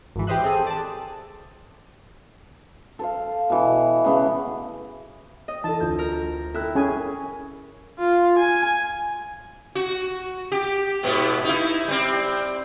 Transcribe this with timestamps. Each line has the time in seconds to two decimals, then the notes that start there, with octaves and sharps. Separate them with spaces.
0.15 G#1 E3
0.27 G4 B4 C5 D#5 E5 F#6
0.44 C4 G#4 A4 D#7
0.67 D5 A5
2.99 A4 C5 F5
3.50 B2 E3
4.04 C#3 A3 B3
5.48 D#5
5.64 E3 A4 A5
5.80 D2 F4 G6
5.99 A#4
6.54 E4 A4 G5 F#6
6.75 C#4 G#4 G#5
7.99 F4
8.39 G#5
9.75 F#4
10.52 G4
11.03 G#2 B2 B3
11.44 D#4 E4
11.88 G3 C4